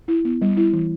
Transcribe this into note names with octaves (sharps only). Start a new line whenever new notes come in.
E4
B3
G3
E4
E3